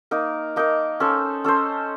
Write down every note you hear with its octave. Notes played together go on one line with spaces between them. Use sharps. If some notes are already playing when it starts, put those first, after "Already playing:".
A#3 D#4 A#4
A#3 D#4 A#4
C#4 A4 C5
C#4 A4 C5